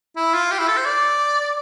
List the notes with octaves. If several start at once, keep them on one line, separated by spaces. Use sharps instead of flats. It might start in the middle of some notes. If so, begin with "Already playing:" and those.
E4
F4
G4
E4
A4
C5
D5